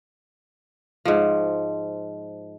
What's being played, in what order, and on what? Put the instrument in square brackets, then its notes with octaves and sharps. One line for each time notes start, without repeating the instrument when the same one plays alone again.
[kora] G#2 F3